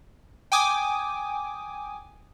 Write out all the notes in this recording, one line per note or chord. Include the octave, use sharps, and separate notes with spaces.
G5 G#5 D6 D#6